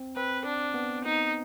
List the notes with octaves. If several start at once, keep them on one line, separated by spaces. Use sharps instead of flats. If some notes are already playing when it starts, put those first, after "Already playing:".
Already playing: C4
C4 B4
D4
B3
D#4